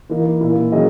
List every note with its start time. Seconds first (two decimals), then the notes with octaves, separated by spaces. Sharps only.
0.10 E3 A#3 D#4
0.41 A#2 A#3 E4
0.72 D#3 F#3 C#4 G#4 D#5